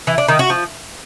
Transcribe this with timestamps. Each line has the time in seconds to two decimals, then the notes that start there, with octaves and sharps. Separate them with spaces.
0.07 E3
0.18 D4
0.29 D#3
0.39 F#4
0.50 F3